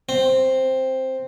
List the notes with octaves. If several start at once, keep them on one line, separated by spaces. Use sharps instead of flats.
C4